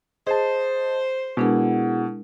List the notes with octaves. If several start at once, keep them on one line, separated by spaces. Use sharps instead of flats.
G#4 C5 D#5 A5
B2 G#3 D4 E4 G#4 A#4 F#5